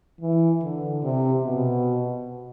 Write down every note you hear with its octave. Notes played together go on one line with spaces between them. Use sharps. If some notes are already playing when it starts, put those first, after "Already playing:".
E3
D3
C3
B2